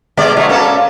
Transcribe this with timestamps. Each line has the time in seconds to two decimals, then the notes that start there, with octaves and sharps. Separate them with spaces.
0.17 B2 G#3 D5
0.36 F#3 G#3 A3
0.49 A#3 C#4 A4